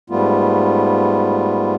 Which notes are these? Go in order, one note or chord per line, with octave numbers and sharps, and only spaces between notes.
G#2 G3 A3 B3 F4